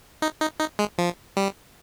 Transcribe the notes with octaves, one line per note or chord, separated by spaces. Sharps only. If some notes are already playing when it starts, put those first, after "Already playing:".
D#4
D#4
D#4
G#3
F3
G3